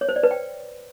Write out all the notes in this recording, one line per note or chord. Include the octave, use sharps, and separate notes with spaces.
C#5
C5
D5
B4
G5